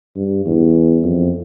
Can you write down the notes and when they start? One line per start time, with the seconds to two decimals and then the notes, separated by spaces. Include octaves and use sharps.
0.16 G2
0.45 E2
1.04 F2